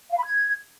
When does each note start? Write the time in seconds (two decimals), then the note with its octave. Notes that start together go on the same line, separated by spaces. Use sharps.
0.11 F5
0.18 B5
0.25 G#6